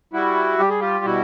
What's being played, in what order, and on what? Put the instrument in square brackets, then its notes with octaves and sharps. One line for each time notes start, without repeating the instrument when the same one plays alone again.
[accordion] G3 E4 F#4
G3 G4
G#4
F4 G4
B2 E4 F#4